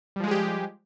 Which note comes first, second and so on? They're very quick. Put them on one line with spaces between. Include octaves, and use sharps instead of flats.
G3 F3 G#3 G#4 G4